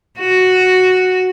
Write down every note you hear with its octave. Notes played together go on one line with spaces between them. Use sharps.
F#4